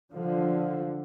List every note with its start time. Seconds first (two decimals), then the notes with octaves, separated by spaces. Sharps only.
0.12 D3 F3